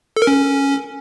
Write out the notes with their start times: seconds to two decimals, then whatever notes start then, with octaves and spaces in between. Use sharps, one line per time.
0.17 A4
0.22 A#4
0.27 C#4